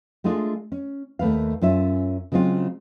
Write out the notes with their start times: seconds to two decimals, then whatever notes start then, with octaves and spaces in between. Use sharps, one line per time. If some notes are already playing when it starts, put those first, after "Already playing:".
0.24 G#3 A3 D4 F4 G#4
0.72 C#4
1.19 D#2 A3 B4 F5
1.62 F#2 C#4 F4 E5
2.32 C#3 F#3 G#3 C4 F4